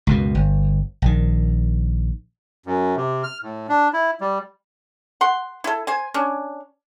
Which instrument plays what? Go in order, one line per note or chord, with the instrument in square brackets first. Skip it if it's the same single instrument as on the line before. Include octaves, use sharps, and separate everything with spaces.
[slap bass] C#2 F#2 B2
G1
A#1 D#3
[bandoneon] F#2
C3
F6
A2
D4
E4
G3
[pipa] F#5 C6
E4 A4
C5 G#5
C#4 D4